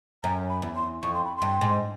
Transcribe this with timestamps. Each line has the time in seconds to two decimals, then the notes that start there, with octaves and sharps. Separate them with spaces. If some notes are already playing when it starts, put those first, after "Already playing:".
0.23 F#2 A#5
0.49 B5
0.62 E2
0.76 C6
1.02 F2 C#6
1.14 C6
1.25 B5
1.36 C6
1.42 G2
1.61 G#2